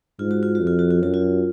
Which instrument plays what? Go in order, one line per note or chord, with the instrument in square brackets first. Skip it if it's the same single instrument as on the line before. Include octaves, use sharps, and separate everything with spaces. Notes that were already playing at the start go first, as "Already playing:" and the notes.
[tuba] G#2 [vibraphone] F4
[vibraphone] F#4
F4
F#4
[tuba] F2
[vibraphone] F4
F#4
F4
[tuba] F#2 [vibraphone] F#4
[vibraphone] F4